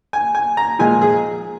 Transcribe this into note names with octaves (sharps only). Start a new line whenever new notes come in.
G#5
G#5
A#5
A#2 F3 G#3 G#5
G#4